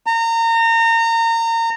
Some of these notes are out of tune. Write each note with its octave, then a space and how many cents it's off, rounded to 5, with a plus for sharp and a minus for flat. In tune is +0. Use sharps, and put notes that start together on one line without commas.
A#5 -30